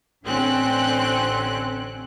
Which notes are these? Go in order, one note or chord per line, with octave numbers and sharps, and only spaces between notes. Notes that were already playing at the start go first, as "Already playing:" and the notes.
A1 D3 C4 C#4 F#6